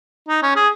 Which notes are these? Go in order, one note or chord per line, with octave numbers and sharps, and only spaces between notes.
D#4
C#4
G#4